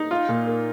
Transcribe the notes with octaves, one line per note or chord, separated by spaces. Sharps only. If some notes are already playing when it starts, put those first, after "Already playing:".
Already playing: D#4
F4
A#2
A#3